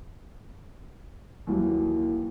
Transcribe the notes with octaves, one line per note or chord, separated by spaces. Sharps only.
D#2 E3 F#3 A#3 G4